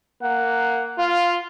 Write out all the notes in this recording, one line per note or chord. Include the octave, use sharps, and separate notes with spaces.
A#3 F#5
F4 F5